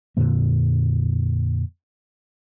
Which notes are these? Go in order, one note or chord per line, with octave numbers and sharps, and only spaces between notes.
F2 A#2 D3 A#3